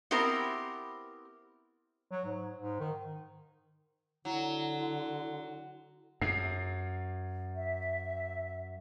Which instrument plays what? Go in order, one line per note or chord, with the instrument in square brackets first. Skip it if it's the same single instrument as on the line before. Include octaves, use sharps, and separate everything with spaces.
[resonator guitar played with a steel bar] B3 C4 E4 G4 A#4 C5
[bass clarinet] F#3
G#2
G#2
D#3
[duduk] D3 [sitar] F#3 [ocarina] E4
[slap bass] F#2 [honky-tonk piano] C7
[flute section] E5